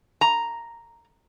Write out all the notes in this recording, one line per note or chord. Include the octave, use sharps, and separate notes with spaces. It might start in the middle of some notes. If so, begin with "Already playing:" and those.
A#5